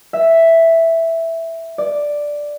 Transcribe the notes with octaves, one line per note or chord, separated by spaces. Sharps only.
E5
D5